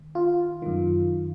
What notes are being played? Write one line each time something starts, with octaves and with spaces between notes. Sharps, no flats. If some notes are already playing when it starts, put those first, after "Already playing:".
Already playing: D#3
F4
F#2 D#3